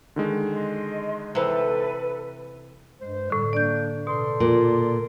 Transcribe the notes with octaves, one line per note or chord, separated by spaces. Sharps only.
D3 D#3 G#3
D#5 C6
C3 E3 A4 B4
G2 G#3 C5
A2 D3 G3
A#3 D4 D5 G6
B2 A4 D5 C6
A#2